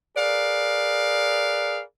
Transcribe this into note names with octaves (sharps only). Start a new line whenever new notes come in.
G#4 A#4 B4 D5 F5